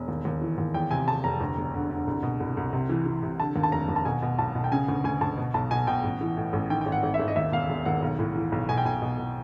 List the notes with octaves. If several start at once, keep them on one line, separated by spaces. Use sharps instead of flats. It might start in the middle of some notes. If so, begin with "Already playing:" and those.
Already playing: E1
D#2
D#2
E3
D#2
E2 G5
C3 G#5
C3 A5
F1 A#5
D2
E1
D3
D3
C2
B2
C2
C2
C3
E3
E3
C3
D3 A5
D#2
A5
F1 A#5
D#2
A5
B2 G#5
B2
B1 A5
B2
G5
C#3 G#5
D2
D2 G#5
D2 A5
B2
B1 A5
B2 G#5
B2 G5
A1
E3
A2
A1
D#3 G5
G5
G#1
F#5
G#1
E5
G#1
D#5
D#2 E5
E1 F5
E1
D#2 F#5
B1
A2
E3
B1
B2 G#5
G5
B1 G#5
B2
B2